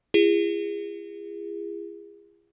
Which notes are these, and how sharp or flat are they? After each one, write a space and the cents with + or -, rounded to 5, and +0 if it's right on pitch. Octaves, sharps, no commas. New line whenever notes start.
E4 +45 G#4 -30